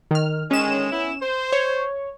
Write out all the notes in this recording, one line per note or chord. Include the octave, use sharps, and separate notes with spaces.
D#3 F6
D3 D#3 G#3 C#4 E7
B3 E4
C5
C#5